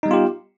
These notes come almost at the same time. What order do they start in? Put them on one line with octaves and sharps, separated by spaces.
D#4 G3 B3 F4 G4